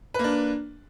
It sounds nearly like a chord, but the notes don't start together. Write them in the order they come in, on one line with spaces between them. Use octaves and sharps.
B4 A#3 D4